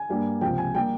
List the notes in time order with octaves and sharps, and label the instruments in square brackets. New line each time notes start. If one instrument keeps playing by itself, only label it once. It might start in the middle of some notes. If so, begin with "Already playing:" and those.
Already playing: [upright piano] G#5
G2 G3 A#3
C#2 C3 F3 G5
G#5
G3 A#3 G5